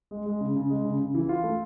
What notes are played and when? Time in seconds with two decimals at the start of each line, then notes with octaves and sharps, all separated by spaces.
0.11 G#3
0.26 G#3
0.41 C#3
0.56 C#3
0.70 G#3
0.85 C#3
1.00 C#3
1.14 E3
1.29 F4
1.44 A3